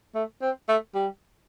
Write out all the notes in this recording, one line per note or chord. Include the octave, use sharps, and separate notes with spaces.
A3
C4
A3
G3